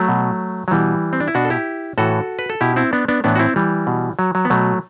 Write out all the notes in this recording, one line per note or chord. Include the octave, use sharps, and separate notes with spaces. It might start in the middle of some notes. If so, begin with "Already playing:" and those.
Already playing: F#3 A3
B2
F#3
B2 E3 G3
C4
D4
E4
B2 D4 F#4
A4
E4 G4
A2 E3 F#4 A4
B4
A4
B2 E4 G4
C4 E4
B3 D4
B3 D4
A2 E3 B3 D4
F#4
C4 E4
E3 G3
B2
F#3
F#3
B3
B2 F#3 A3